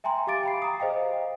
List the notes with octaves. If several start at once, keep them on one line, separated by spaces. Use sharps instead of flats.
E5 G5 G#5 A#5 C6
G4 F5 D6 A6 D7
G5 B5 C7
A#5 D#6
G#4 C5 D#5 F5 G5